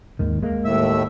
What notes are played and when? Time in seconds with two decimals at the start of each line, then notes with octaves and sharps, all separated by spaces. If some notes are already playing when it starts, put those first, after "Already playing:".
0.19 D#2 G#2 D#3
0.43 G#3 A#3
0.65 D#2 A2 E5